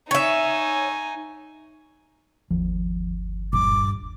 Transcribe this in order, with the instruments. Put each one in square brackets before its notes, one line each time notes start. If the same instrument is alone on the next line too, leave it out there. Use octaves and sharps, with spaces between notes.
[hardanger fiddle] D#4 G#5 [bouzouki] C#5 E5
[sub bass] G1 [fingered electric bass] D#2 F3
[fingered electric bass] D#1 A#2 [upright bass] G2 [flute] D6